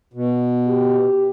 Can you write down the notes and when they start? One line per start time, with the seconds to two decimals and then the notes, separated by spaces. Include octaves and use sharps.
0.14 B2
0.66 G4